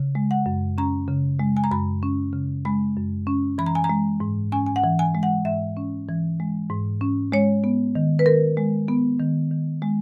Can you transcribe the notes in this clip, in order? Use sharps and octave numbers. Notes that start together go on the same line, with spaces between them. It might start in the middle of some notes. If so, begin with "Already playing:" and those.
Already playing: C#3
G#3
F#5
F#2
C#4 A#5
C#3
G#3
G#5
A#5
F#2 B5
C#4
C#3
G#3 B5
F#2
C#4
E3 B5
A#5
G#5
A#5
G#3
G#2
C#4 G#5
G#5
F#5
E3
G#5
G#3
F#5
G#2 E5
C#4
E3
G#3
G#2
C#4
G#3 C#5
B3
D#3
B4
D#3 A#4
G#3
B3
D#3
D#3
G#3